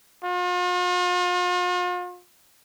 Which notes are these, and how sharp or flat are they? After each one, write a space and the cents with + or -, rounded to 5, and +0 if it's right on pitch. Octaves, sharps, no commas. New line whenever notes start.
F4 +45